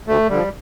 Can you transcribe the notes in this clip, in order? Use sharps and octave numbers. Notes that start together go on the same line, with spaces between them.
D2 A3
D3 F3 G3